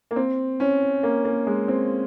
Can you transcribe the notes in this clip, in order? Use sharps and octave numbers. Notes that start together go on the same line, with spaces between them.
A#3
C4
C#4
A#3
A#3
G#3
C4